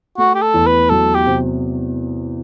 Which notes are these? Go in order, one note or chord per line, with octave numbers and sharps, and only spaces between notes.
A3 F#4
G4
A4
E2
B4
F#3 A4
G4
C3